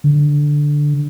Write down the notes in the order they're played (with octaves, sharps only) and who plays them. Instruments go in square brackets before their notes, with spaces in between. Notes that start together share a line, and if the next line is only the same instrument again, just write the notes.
[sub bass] D3